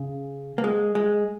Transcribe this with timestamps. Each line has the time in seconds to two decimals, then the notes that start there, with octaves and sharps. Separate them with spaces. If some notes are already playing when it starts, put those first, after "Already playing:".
Already playing: C#3
0.58 A#3
0.64 G#3
0.95 G#3